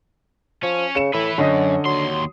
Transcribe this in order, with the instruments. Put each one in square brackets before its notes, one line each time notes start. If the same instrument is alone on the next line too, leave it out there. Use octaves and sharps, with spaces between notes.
[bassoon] F3 [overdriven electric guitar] C#4
[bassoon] C#3 [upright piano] C#7 E7
[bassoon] A2 [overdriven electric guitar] B4 E5
[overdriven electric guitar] F#2 [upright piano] D3 D#5 D#6 [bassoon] C#4
[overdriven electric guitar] D#2 C6 [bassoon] F#3